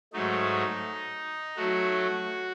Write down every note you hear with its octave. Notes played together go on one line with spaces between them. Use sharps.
G#2 F#3 A3 D#4
F#3 A3 F#4